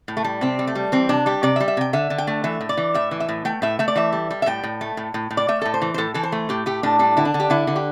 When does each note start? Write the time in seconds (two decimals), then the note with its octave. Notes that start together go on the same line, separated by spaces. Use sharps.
0.08 A2
0.17 A3
0.24 G3
0.41 C3 C4
0.59 G3
0.67 A3
0.75 G3
0.92 E3 C4
1.09 C3 D4
1.26 G3 G4
1.43 C3 D5
1.56 E5
1.60 G3
1.68 E5
1.77 C3 G5
1.93 D3 E5
2.10 D3
2.18 G5
2.27 A3
2.44 E3 E5
2.61 A2
2.69 D5
2.77 E3
2.94 A2 E5
3.11 E3
3.20 E5
3.29 A2
3.45 A3 G5
3.62 A2 E5
3.79 A3 E5
3.88 D5
3.96 E3 E5
4.13 G3
4.30 G3
4.42 E5
4.46 A2 G5
4.63 A2
4.81 A3
4.97 A2
5.14 A2
5.31 A2
5.37 D5
5.48 A3 E5
5.62 A2 A4
5.74 C5
5.82 E3
5.94 C5
5.98 A2 A4
6.14 E3 A4
6.23 C5
6.32 A3
6.49 A2 G4
6.66 A3 G4
6.83 A2 D4
6.99 G3 D4
7.17 D3 E4
7.25 D4
7.34 D3
7.40 G4
7.50 D3 E4
7.67 D3
7.76 G4